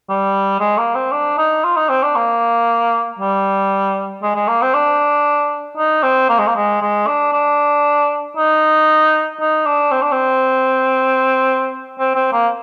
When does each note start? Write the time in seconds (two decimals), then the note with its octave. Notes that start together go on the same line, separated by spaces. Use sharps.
0.09 G3
0.60 G#3
0.78 A#3
0.95 C4
1.12 D4
1.38 D#4
1.64 F4
1.76 D#4
1.89 C4
2.03 D4
2.15 A#3
3.19 G3
4.22 G#3
4.35 G#3
4.48 A#3
4.62 C4
4.74 D4
5.77 D#4
6.03 C4
6.29 A#3
6.39 G#3
6.47 A#3
6.56 G#3
6.82 G#3
7.07 D4
7.33 D4
8.37 D#4
9.40 D#4
9.66 D4
9.91 C4
10.02 D4
10.12 C4
11.99 C4
12.15 C4
12.33 A#3